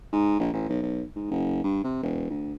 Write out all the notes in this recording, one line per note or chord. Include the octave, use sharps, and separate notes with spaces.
G#2
A#1
A1
B1
B1
G#2
F#1
G2
C3
E1
D2